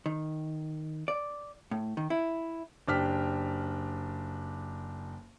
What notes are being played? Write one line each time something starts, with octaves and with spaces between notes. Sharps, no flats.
D#3
D5
A2
D#3
E4
F#1 D4 G4 F6 B6